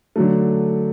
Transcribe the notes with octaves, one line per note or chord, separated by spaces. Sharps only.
D3 F#3 A3